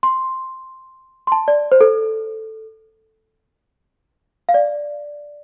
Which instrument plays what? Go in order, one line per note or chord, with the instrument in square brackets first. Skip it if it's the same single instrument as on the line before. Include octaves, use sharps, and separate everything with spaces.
[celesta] C6
C6
A5
D5
C5
A4
F5
D5